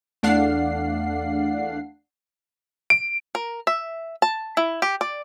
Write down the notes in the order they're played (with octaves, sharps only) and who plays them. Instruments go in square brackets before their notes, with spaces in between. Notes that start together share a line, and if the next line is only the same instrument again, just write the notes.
[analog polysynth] E2 A3 D4 F5 F#5 C7
[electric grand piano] D7
[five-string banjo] A#4
E5
A5
E4
G4
D5